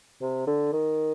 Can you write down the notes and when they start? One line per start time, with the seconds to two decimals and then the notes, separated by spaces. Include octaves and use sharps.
0.21 C3
0.47 D3
0.73 D#3